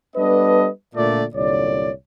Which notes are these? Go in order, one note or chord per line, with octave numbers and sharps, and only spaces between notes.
G3 B3 D4 A4 B4 D#5
A#2 D3 A3 D5
C2 F#2 A#2 D3 C#5 D5